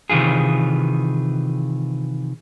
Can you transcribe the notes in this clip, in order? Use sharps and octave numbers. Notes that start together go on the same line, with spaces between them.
C3 D#3 E3 F4 G#4